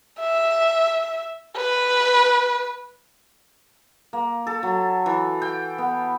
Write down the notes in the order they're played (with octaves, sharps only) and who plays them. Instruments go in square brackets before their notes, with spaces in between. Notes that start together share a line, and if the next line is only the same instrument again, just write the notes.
[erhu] E5
B4
[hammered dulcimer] A#3
A4
F#3
E3
G5
B3